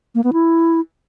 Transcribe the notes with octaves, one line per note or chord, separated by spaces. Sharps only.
A#3
B3
E4